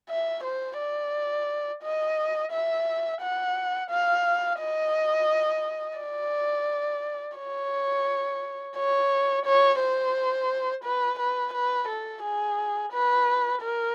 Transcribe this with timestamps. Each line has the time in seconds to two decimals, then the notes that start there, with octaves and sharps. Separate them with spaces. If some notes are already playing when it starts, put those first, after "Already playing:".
0.10 E5
0.44 C5
0.78 D5
1.83 D#5
2.52 E5
3.21 F#5
3.90 F5
4.60 D#5
5.99 D5
7.38 C#5
8.77 C#5
9.46 C#5
9.80 C5
10.84 B4
11.19 B4
11.54 B4
11.88 A4
12.23 G#4
12.93 B4
13.62 A#4